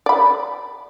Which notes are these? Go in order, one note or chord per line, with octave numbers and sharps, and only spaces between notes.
D5 B5